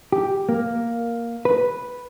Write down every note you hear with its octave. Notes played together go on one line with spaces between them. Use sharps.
G4
A#3
B4